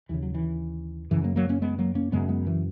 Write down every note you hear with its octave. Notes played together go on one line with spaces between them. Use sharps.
D#2 C#3 E3
F#3
E3
F#2 C#3 E3
F#3 A#3
F#3 A#3
A#3 C#4
G#3 B3
F#3 A#3
A#3 C#4
F#2 C#3 G#3 B3
G#3 B3
E3